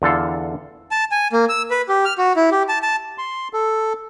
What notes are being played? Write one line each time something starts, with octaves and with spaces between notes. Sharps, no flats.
E2 D3 F4 A4 F5
A5
G#5
A#3
E6
B4
G4
F6
F#4
E4
G4
A5
A5
C6
A4